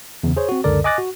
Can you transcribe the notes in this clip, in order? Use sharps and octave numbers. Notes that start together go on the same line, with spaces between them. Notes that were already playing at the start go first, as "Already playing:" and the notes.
E2 C#3
G#4 C5 C#5
C4 F#4
C#2 F#2 D3 A4 A#4 D5
D#5 G#5 D6 F#6 A6 A#6
F#4